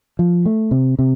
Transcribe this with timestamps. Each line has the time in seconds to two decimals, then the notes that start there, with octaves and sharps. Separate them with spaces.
0.19 F3
0.46 A3
0.71 C3
0.99 C3